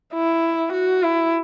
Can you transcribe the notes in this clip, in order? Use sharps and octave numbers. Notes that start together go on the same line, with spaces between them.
E4
F#4
E4